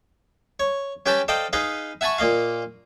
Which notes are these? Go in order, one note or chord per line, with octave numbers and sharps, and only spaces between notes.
C#5
C#4 G4 B4 G5 A5 B5
A4 C5 D5 D#5 F5 G5
D#4 G#4 B4 D#5 F5
E5 F#5 G#5 A5 B5 C#6
A#2 A#3 D#5 F5